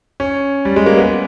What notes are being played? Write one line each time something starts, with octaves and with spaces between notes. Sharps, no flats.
C#4
G3
G#3
A#3
B3